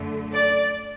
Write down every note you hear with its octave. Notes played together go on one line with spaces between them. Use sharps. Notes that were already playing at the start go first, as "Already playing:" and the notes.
Already playing: F#2 D3 A3
D5